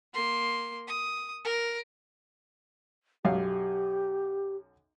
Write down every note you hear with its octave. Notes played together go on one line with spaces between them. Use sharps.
A#3 C6
D#6
A#4
B1 F#2 G4 F5